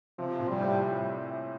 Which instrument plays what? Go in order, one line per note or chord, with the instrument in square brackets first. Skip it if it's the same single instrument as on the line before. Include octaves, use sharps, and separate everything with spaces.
[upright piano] C3 [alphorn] F3
[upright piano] C3
A#2
[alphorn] G3
[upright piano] A2